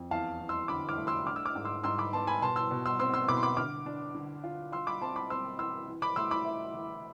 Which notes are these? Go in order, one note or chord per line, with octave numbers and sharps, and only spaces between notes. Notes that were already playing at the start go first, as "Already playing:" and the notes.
Already playing: F2
E2 F5 A5
E2
C6 E6
D3 B5 D6
D6 F6
A3
C6 E6
D4 D6 F6
E6
D6 F6
G#2
C6 E6
G#2 C6 E6
B5 D6
B3 A5 C6
G#5 B5
B2 A5 C6
C6 E6
B2
C6 E6
C4 C6 E6
C6 E6
B2 B5 D6
C6
B5 D6
D3 D6 F6
D4
D3
F4
F4 C6 E6
B5 D6
C4 A5 C6
B5 D6
C4 C6 E6
E3 C6 E6
E3
B5 D6
A3 C6 E6
B5 D6
E4
E3